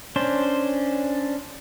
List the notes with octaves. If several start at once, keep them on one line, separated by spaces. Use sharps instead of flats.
C#4 D4 C5